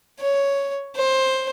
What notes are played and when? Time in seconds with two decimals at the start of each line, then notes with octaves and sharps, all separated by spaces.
0.20 C#5
0.96 C5